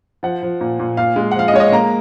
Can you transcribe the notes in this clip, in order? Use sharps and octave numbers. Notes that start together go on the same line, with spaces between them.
F3 F#5
F3
A#2
A#2
A#2 F5
G#3
F#5
F3 F5
D#5
G#3 C#5
D#5
A#3 A#5